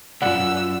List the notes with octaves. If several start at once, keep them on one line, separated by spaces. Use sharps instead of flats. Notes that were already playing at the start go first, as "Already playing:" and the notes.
B1 F#2 F4 D5 F#5 E6